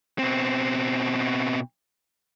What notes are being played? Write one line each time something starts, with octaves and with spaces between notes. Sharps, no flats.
B2 C4